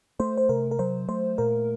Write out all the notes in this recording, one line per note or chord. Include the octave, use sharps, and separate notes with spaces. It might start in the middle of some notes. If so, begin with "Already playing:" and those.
A3 C5
C5
C3 A#4
A#4
F#3 C5
A3 C5
A#2 A#4